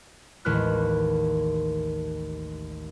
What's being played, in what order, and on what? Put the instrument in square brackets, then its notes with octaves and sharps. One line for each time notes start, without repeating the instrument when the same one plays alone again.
[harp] A1 D#2 G#3 B4 F6 F#6